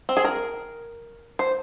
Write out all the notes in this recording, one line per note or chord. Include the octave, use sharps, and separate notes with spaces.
C4
G#4
A#4
C5